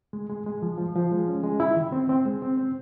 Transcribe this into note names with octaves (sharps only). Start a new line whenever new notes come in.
G#3
G#3
G#3
F3
F3
F3
G#3
C#4
G#3
E4
D#3
C4
C4
G#3
C4
C4